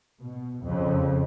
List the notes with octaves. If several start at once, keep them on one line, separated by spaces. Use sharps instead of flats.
B2
F2 C#3